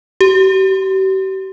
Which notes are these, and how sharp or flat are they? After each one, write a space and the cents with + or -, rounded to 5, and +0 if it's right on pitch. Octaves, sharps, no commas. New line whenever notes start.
G4 -40